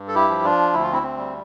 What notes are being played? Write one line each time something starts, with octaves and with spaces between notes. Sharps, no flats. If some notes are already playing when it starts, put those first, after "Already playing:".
Already playing: G2
A4
E4 G4
F3
D4 F4
D2 E4
F4
C4 E4
C4
G3